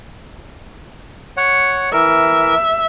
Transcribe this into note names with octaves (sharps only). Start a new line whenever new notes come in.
C#5 F#5
E3 A#4 E5